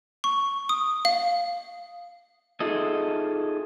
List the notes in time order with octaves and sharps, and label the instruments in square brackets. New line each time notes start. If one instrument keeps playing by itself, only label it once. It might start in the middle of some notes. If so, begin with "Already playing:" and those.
[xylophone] C#6
D#6
F5
[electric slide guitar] D#4 F4 G#4 A4 D#5 E5